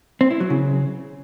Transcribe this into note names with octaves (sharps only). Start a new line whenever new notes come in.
C4
E4
F#3
C#3